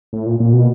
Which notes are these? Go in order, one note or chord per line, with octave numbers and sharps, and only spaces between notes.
A2
A#2
A#2
B2